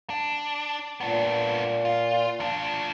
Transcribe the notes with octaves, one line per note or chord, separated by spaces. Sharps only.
D4
A#2 B3 D4
F4
F3 D4